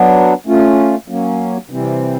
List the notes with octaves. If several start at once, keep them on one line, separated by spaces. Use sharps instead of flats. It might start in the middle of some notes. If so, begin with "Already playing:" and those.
Already playing: F#3 B3 D4
A3 C#4 F4
F#3 A#3 C#4
C3 E3 G3 C4